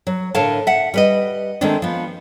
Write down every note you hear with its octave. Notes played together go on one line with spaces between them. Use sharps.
F#3
A2 D3 A#4 C#5 F5 A5
E5 F#5
G3 B4 D#5
D#3 G#3 A3 C4 D4
F3 B3